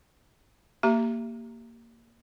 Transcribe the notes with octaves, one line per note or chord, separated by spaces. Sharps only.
A#3 G4 A#5